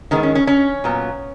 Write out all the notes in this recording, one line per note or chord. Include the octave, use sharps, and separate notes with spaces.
D#3 G#3 B3 C#4
C#4
C#4
C#4
A#2 F#3 B3